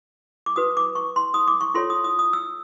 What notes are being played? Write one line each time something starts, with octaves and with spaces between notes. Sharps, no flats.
D6
F#4 B4 D#6
D6
C#6
C6
D#6
D6
C#6
F4 A4 C#5 C6
D#6
D#6
D#6
E6